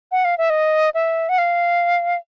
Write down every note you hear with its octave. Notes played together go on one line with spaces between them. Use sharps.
F#5
F5
E5
D#5
E5
F#5
F5